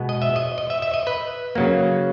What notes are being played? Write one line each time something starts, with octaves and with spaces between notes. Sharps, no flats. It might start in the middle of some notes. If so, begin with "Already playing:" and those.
Already playing: B2 G#3 B3
D#5
E5
D#5
D#5
E5
E5
D#5
B4
C#3 F#3 A#3